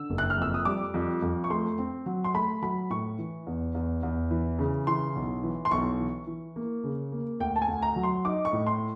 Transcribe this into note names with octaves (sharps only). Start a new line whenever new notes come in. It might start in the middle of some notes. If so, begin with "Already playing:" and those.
Already playing: D3 E6
F#1
F#6
F6
F2 E6
D#6
G3 D6
F2
F2
C#6
A3 C6
C4
F#3
C6
A3 B5
F#3 B5
A2 C#6
E3
E2
E2
E2
E3
C#3
E3 C6
B1
E3
C6
B1 C#6
E3
E3
A#3
C#3
A#3
D2 G5
A5
G#5
D2
A#5
F#3
C6
D#4 D6
C#6
A2
C6